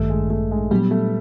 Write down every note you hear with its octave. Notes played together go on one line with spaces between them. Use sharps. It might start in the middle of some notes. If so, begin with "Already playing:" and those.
Already playing: A1 G2 D#3 A3
G#3
A3
G#3
A#2 F#3 G3 B3
A3